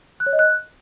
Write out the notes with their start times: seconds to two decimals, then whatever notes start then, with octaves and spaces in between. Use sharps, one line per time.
0.20 F#6
0.26 C#5
0.33 D#5
0.39 F#6